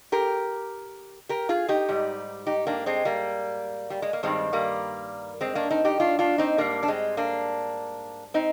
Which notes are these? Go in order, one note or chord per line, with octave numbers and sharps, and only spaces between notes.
G4 A#4
G4 A#4
F4 G#4
D#4 G4
G#2 G3
D#4 G4
A#3 D4
G#3 C4
G3 A#3
G3
G#3
A#3
G2 D#3 G3 G#3 C4
G3 A#3
G#3 C4
A#3 D4
C4 D#4
D#4 G4
D4 F4
D4 F4
C4 D#4
G#2 G3 A#3 D4
D4
G#3 C4
A#3 D4
C4 D#4